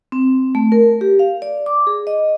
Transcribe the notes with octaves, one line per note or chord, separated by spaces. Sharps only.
C4
A3
A#4
G4
F5
D5
D6
G#4
D#5